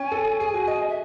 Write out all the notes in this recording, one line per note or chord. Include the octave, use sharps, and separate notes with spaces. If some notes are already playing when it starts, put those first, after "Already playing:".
Already playing: C#4 G#5
A4
G#4
F#4
D#5
D#5
E5